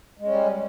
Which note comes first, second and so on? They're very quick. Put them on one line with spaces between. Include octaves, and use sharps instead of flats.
G#3 C#4 G3